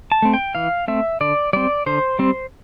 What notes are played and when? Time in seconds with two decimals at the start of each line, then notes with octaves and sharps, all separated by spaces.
0.12 A5
0.22 A3 C4
0.33 G5
0.55 E3 F5
0.88 A3 C4 E5
1.21 D3 D5
1.53 G3 C4 D5
1.86 D3 C5
2.19 G3 C4